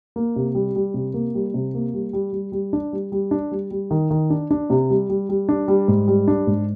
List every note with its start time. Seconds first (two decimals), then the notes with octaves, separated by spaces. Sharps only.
0.16 A#3
0.36 C3
0.55 G3
0.75 G3
0.94 C3
1.14 A#3
1.35 G3
1.54 C3
1.74 A#3
1.94 G3
2.13 G3
2.33 G3
2.52 G3
2.73 D4
2.93 G3
3.12 G3
3.31 D4
3.51 G3
3.71 G3
3.91 D#3
4.11 D#3
4.30 D4
4.51 D4
4.70 C3
4.90 G3
5.10 G3
5.29 G3
5.49 D4
5.68 G3
5.88 G#2
6.08 G3
6.28 D4
6.47 G#2